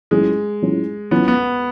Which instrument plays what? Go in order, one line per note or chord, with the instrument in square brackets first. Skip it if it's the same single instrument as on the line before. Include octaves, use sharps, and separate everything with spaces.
[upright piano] A2 F#3 C#4 F4 [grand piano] G#3
[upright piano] A2 F#3 C#4 F4
[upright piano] A2 F#3 C#4 F4 [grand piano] B3
[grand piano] B3